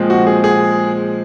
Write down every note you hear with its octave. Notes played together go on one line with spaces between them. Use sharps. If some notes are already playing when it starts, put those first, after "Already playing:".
Already playing: A#2 F3 G#3 C4
F#4
G#4
G#4